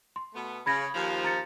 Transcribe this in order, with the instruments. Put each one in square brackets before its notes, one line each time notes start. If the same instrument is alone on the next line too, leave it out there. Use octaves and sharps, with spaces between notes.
[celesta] C6
[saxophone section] B2 A3 B3
[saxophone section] C#3 [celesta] B5 G#6 A#6
[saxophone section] D#2 F3
[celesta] A#5 A6 C#7